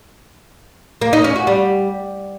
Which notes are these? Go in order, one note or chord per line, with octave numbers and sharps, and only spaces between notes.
A#3
D#4
C#4
F#4
G3